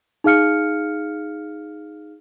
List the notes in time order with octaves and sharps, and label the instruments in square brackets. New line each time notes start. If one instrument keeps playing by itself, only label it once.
[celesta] D#4 G#4 F5 F6 C#7